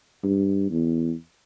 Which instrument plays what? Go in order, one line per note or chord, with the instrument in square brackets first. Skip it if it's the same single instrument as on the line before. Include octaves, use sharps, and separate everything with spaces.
[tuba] G2
E2